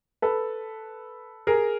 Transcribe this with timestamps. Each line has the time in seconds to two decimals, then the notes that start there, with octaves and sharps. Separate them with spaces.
0.22 A4 B4
1.47 G#4 A#4